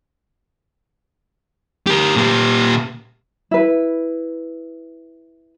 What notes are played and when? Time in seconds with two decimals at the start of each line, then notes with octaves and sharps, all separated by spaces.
1.87 G4 A#4
2.16 A#2 G4
3.51 E4 B4